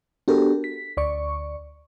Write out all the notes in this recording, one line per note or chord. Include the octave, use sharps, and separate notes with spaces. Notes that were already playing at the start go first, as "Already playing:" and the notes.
B3 D4 F#4 G4 A4 A#4
B6
D2 D5 C#6